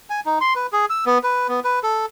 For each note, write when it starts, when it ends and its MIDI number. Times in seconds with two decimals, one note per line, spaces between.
0.10 0.20 80
0.26 0.39 63
0.41 0.54 84
0.55 0.67 71
0.73 0.86 68
0.90 1.04 88
1.06 1.18 59
1.23 1.47 71
1.49 1.60 59
1.64 1.79 71
1.83 2.06 69